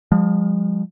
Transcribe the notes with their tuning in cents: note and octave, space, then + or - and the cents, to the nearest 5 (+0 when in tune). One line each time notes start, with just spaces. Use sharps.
F3 +20 G#3 -40